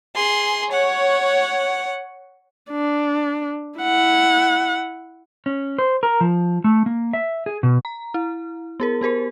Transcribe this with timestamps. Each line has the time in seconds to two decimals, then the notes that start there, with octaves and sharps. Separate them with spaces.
0.15 G#4 C6
0.71 C#5 F#5
2.70 D4
3.79 E4 F#5
5.46 C#4
5.79 C5
6.03 A#4
6.21 F3
6.64 A3
6.86 A#3
7.13 E5
7.46 G#4
7.63 B2
7.85 A#5
8.14 E4
8.80 B3 G#4 A#4
9.01 B3 G4 A#4 C5